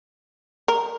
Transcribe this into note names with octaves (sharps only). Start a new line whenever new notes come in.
A#4